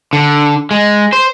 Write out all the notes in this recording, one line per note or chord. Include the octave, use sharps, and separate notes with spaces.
D3
G#3
C5